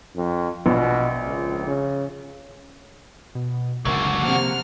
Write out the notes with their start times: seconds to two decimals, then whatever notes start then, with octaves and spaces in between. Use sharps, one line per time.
0.16 F2
0.66 A#1 B2
1.26 C#2
1.66 C#3
3.35 B2
3.85 F#1 C#2 A#2 D3 D#3 F#3
4.23 C3 F3 A#3 F#5 F6